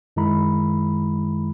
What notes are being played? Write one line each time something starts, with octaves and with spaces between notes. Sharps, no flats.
F#2 D#3 G#3 E4 A#5 B5